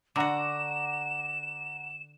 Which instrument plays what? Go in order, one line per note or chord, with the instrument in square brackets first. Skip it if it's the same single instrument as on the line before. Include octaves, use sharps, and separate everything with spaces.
[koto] D3 F#4 [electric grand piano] F#5 A#5 D6 [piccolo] E7